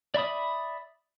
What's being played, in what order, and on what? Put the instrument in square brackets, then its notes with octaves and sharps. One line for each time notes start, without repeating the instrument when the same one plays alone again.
[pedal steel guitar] D5 E5 B5 D#6